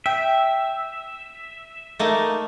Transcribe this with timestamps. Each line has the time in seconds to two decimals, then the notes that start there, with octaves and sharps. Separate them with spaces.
0.06 E5 G5
1.99 A3 A#3 D#4